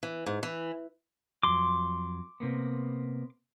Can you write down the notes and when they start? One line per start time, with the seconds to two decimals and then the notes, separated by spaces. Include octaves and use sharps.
0.03 E3
0.26 G#2
0.43 E3
1.43 F2 F#3 C6 D6
2.40 C3 A#3 B3